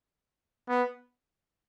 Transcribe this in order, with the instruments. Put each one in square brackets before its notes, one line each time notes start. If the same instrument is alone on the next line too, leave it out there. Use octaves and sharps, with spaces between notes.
[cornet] B3